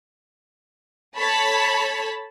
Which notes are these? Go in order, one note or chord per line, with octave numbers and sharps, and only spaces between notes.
A4 C#5 A5 B5